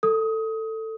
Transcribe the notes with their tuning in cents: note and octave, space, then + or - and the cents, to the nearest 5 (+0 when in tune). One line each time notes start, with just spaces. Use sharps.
A4 +15 D#6 +20